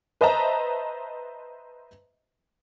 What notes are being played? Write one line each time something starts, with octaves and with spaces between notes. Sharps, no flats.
B4 C5 D#5 E5 A5 A#5